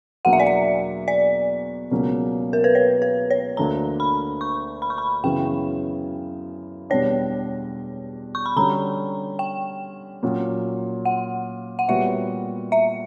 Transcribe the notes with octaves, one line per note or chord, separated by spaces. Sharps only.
E2 B2 F#3 A#3 D4 F#5
E5
D5
E5
D5
C#2 B2 F#3 A#3 C#4
A#4
B4
C#5
B4
C#5
D2 D3 A#3 D4 A#5
B5
C#6
B5
C#6
B5
F#2 C#3 E3 B3 G5
E2 B2 G3 B3 D4 C#5
C#6
B5
D3 G3 C#4 F#4 A#5
G5
A#2 F#3 C#4 F#4
F#5
F#5
A#2 G3 B3 F#4 C#5 E5
E5